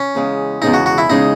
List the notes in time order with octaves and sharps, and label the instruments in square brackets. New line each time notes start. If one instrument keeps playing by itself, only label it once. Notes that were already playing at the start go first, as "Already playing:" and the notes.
Already playing: [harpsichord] C#4
[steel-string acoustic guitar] E2 C#3 G#3
[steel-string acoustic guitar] E2 C#3 G#3 [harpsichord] D#4
[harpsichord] F#4
F#4
E4
[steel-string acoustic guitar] E2 C#3 G#3 [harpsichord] D#4